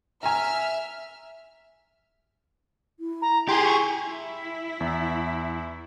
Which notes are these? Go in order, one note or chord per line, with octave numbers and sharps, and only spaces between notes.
E5 G#5 A#5 F6
E4
A#5
G4 G#4 C6
C#6
E4
E2